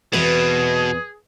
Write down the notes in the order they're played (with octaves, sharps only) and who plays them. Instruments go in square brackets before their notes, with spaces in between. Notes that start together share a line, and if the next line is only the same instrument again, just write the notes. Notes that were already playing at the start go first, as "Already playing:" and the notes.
[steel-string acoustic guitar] E2 C4 B4 [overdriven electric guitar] B2 [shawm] G#4